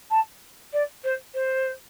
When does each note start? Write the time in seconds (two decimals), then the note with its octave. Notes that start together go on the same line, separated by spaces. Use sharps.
0.10 A5
0.73 D5
1.04 C5
1.34 C5